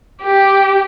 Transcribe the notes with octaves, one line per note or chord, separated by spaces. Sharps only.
G4